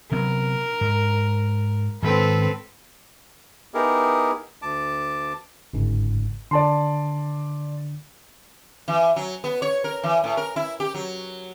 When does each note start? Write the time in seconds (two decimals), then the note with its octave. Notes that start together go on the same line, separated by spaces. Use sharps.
0.12 C3 F#3 B3 A#4
0.81 G#2
2.02 G#2 D#3 G#3 C4 A4 B4
3.74 B3 D#4 E4 G4 G#4 A#4
4.62 D2 A5 D6
5.73 G1 G#2 C#3
6.51 D3 D5 A5 C6
8.88 E3
9.16 F#3
9.44 B3
9.62 C#5
9.84 A#4
10.04 E3
10.24 A2
10.37 A#4
10.56 E4
10.80 G4
10.94 F#3